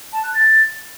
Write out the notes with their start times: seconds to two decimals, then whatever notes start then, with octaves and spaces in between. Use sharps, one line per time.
0.13 A5
0.24 F#6
0.34 A6